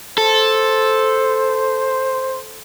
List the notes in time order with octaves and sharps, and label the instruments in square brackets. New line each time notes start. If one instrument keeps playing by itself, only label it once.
[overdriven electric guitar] A4 [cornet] C5